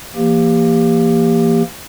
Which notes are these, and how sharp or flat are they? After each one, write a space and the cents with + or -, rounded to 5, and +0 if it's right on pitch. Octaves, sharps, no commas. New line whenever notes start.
E3 +45 A#3 +0 G4 +20